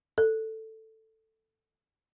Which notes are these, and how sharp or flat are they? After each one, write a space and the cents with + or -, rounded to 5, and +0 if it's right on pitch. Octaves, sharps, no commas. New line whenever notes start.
A4 +5